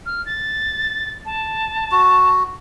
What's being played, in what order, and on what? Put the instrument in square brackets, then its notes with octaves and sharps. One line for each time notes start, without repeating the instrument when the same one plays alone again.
[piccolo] F6
A6
A5
[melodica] F#4